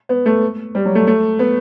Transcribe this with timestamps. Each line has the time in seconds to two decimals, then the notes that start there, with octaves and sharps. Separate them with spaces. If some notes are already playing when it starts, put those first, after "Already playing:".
0.09 B3
0.26 A3
0.75 G3
0.86 F#3
0.95 A3
1.07 A3
1.39 B3